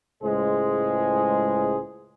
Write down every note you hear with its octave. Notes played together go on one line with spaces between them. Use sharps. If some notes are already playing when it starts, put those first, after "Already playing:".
C#2 A2 G#3 G#4 C5